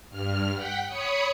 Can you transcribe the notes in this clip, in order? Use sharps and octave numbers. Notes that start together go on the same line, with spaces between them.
G2 F6
F#5 G5 B6
C#5 B5 D#6 C#7